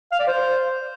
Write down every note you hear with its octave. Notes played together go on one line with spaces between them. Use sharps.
F5
D5
C5